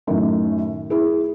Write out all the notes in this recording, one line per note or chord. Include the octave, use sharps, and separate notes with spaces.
F#2 A2 D#3
E4 G#4